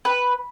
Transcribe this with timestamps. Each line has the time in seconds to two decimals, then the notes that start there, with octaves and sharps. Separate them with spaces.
0.05 B4